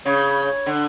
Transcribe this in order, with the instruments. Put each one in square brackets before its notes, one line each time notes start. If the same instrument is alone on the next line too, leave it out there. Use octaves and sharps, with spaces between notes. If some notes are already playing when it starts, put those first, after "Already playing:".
[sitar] C#3 [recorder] C#5
[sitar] D3